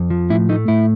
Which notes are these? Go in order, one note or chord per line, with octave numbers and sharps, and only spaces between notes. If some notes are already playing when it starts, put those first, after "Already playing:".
Already playing: F2
F3
A2 E4
A3 D#4
A2 E4